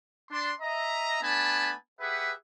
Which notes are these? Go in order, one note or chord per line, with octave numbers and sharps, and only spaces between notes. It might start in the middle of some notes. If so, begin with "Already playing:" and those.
D4 C6
D#5 E5 A#5
A3 B3 D4 G#5 A5 B5
G4 G#4 B4 E5 F#5